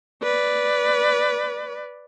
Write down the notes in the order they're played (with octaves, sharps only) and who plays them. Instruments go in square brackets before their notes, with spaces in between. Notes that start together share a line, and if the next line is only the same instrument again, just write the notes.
[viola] B4 D5